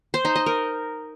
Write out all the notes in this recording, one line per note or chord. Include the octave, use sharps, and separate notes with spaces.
C5
D#4
D#5
A#4